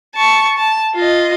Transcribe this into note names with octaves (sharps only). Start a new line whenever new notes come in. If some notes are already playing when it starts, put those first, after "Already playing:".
A5 C#6
A5
F4 D#5